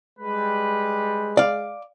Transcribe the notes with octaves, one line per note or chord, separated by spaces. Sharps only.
G3 G#3 B4
D5 F5